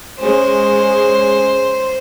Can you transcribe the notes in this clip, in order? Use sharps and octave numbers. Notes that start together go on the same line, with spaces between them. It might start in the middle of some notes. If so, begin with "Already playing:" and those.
G#3 C#4 C5